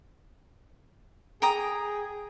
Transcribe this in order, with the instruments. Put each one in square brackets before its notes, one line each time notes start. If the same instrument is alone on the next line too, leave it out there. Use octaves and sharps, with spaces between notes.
[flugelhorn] G#4 [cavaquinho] G5 A#5 D#6